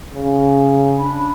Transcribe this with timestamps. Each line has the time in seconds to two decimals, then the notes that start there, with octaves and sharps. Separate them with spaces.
0.14 C#3
0.98 D4 B5